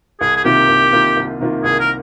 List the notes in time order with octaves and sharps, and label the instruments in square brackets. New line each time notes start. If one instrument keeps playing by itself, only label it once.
[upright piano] C2 [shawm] G#4
[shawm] G#4
[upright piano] C3 D#3 A#3 F4 [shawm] G4
[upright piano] C2
C3 D#3 A#3 F4
C2
C3 D#3 A#3 F4
[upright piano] C2 [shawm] G#4
[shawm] A#4